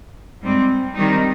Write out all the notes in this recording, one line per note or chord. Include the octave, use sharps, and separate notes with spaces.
G#2 G3 C4
D#3 G3 C4 D#4